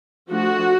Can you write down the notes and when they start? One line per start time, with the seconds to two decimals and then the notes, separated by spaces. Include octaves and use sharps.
0.29 F3 A3 D4 F#4